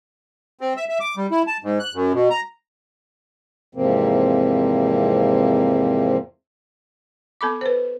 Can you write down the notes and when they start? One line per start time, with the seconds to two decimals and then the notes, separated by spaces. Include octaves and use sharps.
0.61 C4
0.77 E5
0.89 E5
1.00 D6
1.17 G3
1.31 E4
1.47 A5
1.63 G#2
1.80 F#6
1.94 F#2
2.13 B2
2.30 A#5
3.75 E2 G#2 C3 F3 A#3 C4
7.41 B3 A4 B5 D6
7.61 B4 C5